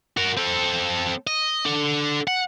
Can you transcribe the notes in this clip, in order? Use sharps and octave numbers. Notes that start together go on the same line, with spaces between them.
F#4 A#4
C4 A4
D#5
D4 A4
F#5